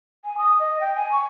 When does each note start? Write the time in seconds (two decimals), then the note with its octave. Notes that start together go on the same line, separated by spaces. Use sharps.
0.24 G#5
0.38 D#6
0.60 D#5
0.81 G5
0.96 G#5
1.12 C#6